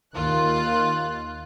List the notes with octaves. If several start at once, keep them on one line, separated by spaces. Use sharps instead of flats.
D#2 F4 F#6